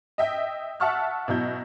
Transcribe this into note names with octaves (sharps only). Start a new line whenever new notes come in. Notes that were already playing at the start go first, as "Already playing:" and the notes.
D#5 E5 G5
E5 F#5 A5 C#6 E6 F6
B2 F#3 E4 G6